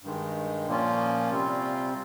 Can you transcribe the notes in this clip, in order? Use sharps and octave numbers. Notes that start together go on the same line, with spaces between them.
G2 D#3 G#3
A#2 F3 A#3 C#4 F4
C3 G3 C4 F4